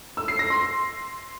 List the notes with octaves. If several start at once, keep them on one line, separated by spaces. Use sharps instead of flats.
E6
C7
A#6
C6